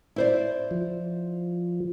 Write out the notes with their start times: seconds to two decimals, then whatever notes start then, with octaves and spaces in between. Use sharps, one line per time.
0.16 E4 C5 D5
0.71 F3